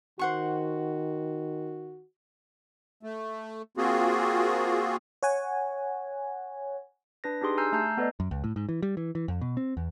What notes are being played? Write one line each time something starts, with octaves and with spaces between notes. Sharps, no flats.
D#3 F#4 C5 F#5 C#6
A3
A#3 C4 F4 F#4 G#4
C#5 F#5 G#5
D4 B4 A#6
D4 D#4 G4 G#4 C6 D#6
G#5 A#5 E6 F6 G6 C7
A3 A5 A#5 G6 C7
B3 A4 B4 D5 D#5
F#2
C#2
A2
G#2
E3
G3
E3
E3
F2
B2
C4
E2